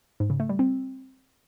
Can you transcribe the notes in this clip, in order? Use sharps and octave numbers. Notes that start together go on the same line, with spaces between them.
G#2
C#3
A3
G3
C4